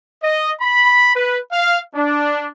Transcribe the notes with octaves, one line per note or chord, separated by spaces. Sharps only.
D#5
B5
B4
F5
D4